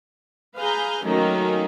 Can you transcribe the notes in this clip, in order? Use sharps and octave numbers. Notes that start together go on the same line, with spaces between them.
G#4 B4 F5 G#5 A#5 G6
D#3 F#3 A3 A#3 C#4 D#4